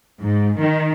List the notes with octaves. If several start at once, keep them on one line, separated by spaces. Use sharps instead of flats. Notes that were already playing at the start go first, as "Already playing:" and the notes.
G#2
D#3